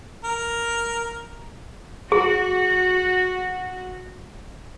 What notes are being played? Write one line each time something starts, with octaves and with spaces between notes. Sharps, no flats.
A#4
F#4 G#4